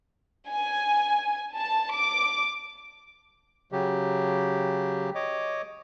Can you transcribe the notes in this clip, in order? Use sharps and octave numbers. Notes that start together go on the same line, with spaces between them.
G#5
A5
D6
C#3 F#3 G4
C#5 D#5 D6